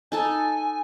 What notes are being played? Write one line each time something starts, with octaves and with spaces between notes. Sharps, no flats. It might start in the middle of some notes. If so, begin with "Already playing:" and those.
D#4 A4 G#5 A5